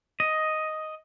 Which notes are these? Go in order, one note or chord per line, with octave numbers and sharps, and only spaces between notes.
D#5